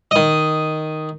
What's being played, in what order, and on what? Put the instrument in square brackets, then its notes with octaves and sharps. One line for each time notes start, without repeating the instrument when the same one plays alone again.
[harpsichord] D#3 D#5